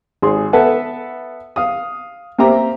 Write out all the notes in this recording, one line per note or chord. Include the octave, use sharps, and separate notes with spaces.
G#1 G#4 C6
B3 A4 B4 E5 F#5 A5
F5 D#6
A#3 C4 G4 E5 A#5